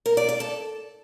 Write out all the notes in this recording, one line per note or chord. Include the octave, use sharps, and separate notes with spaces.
A#4
D5
D5
A4